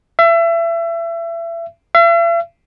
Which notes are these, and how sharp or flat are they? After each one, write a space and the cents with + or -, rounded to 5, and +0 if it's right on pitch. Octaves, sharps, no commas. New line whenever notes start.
E5 +30
E5 +45